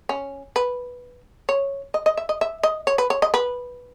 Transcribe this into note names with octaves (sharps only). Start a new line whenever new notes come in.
C#4
B4
C#5
D#5
D#5
E5
D#5
E5
D#5
C#5
B4
C#5
D#5
B4